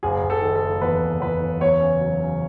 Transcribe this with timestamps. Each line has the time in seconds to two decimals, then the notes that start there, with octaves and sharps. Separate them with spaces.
0.03 F#1 G#4
0.23 F#1
0.30 A4
0.42 D#3
0.55 A4
0.62 F#1
0.81 E2 B4
1.02 F#1
1.20 E2 B4
1.40 F#1
1.61 E2 C#5
1.79 C#3
2.00 F#3
2.19 C#3